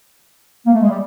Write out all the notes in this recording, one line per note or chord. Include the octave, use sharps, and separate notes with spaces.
A#3
A3
G#3
G3